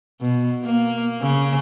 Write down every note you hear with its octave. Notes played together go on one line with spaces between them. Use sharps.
B2
A#3
C#3